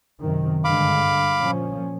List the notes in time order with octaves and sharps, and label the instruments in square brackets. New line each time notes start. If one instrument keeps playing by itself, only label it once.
[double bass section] F#2 C3 D#3
[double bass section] G2 D3 G#3 [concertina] F5 B5 D6
[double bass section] A#2 F3 C#4